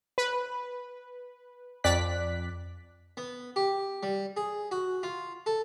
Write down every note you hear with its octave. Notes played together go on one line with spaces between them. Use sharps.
B4
F2 D5 F#6 B6
B3
G4
G3
G#4
F#4
F4
A4